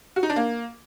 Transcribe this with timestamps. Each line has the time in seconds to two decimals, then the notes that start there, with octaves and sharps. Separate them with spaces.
0.16 F#4
0.23 D#4
0.30 D4
0.36 A#3